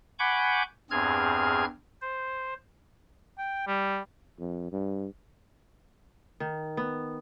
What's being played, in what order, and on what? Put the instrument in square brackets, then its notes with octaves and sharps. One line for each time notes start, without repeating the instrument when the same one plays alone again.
[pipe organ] F#5 G#5 B5 C#6 D6 G6
E2 G2 C4 G#4 F6 G#6
C5
[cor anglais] G5
G3
[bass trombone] F2
G2
[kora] D#3
B3